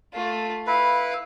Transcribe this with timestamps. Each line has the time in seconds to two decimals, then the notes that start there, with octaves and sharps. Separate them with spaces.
0.14 A3 F4
0.67 E4 B4 F5